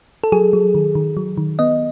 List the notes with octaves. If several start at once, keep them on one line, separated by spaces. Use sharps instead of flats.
A4
F#3 G#4
F#3
D#3
D#3
F#3
D#3
B3 D#5